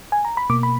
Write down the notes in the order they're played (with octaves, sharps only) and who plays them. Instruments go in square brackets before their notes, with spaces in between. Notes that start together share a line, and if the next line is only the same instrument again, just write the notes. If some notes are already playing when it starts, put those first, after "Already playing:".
[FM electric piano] G#5
A#5
B5
B2 A#3 D6
B5